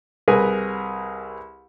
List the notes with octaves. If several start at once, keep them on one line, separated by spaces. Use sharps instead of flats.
C2 G#4 A#4 B4 G#5